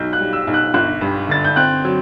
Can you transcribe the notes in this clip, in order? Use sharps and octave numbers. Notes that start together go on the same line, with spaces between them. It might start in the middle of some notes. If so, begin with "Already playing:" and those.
Already playing: B1 F#3 G6
F#6
G3
E6
B1
F#6
G1 F#6
G2
D3 A6
G6
C4 F#6
F#3